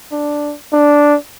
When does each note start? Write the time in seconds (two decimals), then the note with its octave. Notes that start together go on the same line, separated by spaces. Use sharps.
0.12 D4
0.73 D4